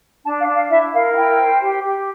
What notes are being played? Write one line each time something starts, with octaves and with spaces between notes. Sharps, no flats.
D4 A5
F5
D4
F5
E4 E5
A#4 F5
F5
E4 G5
C5
G4
G4